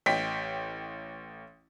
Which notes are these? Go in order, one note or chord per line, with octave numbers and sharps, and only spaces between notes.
A1 D#5 G5 B6